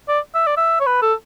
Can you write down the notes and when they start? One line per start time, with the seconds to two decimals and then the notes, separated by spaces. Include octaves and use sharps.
0.08 D5
0.35 E5
0.47 D5
0.57 E5
0.80 C#5
0.87 B4
1.02 A4